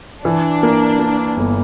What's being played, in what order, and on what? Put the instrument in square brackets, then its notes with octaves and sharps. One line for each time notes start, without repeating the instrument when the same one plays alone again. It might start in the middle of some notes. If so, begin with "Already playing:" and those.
[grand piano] E3 [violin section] D4
[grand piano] A#3
A#3
G1